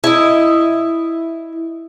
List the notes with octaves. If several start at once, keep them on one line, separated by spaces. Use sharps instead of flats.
E4 D#5